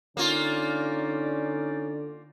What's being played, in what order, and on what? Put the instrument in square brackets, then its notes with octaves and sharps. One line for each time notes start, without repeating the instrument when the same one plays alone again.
[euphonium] D3 [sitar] A#3 F4 [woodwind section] C#4 D#4 D5